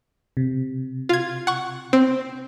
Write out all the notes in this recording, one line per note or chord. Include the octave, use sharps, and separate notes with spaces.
C3
F4 G#6
F#5 C#6
C4